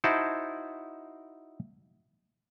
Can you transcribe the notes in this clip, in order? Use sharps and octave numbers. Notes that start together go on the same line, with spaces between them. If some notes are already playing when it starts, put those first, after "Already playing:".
D#4 E4 F#4 C5 A5